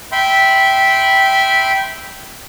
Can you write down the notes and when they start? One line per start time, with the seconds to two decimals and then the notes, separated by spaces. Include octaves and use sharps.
0.12 E5 G5 B5 C6